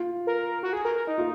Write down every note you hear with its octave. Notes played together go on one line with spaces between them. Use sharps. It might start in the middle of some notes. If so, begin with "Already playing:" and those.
Already playing: F4
A#4
F#4
G#4
A#4
A#4
D#4
F4